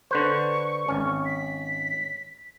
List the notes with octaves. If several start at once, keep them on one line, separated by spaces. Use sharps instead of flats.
D3 B4 C5 C#6
G#1 C#4
B6